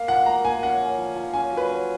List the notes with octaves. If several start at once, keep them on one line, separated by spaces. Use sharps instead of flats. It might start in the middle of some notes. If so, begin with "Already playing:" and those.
Already playing: A#3 F5
F3 F#5
A#3 A#5
A#3 G#5
C#4 F#5
C#4
F3
F3
C#4 G#5
F#3
B4
C#4